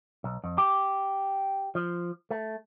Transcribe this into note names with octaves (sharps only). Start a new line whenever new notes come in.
B1
F2
G4
F3
A3